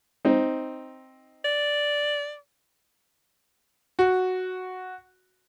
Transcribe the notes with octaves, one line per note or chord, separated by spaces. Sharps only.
C4 D#4
D5
F#4